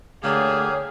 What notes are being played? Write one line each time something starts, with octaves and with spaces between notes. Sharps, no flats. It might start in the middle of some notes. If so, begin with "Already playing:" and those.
D2 D3 A#3 G4 G#4 C#5 F5